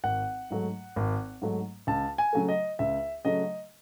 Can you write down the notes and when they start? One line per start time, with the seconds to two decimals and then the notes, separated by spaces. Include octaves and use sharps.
0.04 G#1 F#5
0.50 G#2 F#3 A3
0.96 G#1
1.42 G#2 F#3 A3
1.87 C#2 A5
2.18 G#5
2.33 C#3 F#3 A3
2.48 D#5
2.79 C#2 E5
3.25 C#3 F#3 A3 D#5